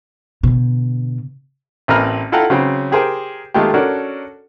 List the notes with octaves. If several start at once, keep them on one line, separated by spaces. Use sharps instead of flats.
B2 D3
A1 A#3 C4 B4 A#5 F6
E4 F4 A4 F#5 G5 A#5
C#3 F#3 C4 B4
G4 G#4 A#4 C5 G5
D#3 G#3 A3 F4 G4
C#4 D4 F#4 A4 A#4